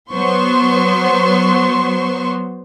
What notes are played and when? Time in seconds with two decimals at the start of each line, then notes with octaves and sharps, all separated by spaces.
0.12 F#3 B3 C5 C6 C#6